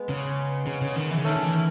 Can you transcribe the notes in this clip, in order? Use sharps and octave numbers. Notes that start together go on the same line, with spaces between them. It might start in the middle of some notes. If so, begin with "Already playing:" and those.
Already playing: G#3 B3
C#3
C#3
C#3
D#3
E3
C#3
D#3 A3 C#4
D#3
E3